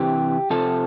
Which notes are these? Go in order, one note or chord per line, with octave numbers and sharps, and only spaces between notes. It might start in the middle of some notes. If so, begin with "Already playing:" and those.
Already playing: C3 E3 G4
C3 F3 A4